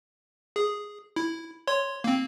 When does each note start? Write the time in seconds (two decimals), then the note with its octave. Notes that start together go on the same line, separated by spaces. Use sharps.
0.56 G#4
1.16 E4
1.67 C#5 C6
2.04 A#3 C4